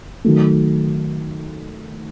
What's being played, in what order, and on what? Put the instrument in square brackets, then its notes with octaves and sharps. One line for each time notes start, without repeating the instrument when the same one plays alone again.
[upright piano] D#3 F#3 A3